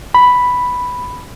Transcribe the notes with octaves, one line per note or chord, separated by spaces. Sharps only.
B5